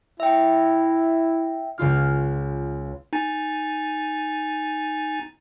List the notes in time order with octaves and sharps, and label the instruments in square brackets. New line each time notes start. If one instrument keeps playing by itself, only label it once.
[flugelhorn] E4 [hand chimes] E5 G5
[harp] C#2 C#3 F4 F6
[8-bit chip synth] D#4 G#5 A6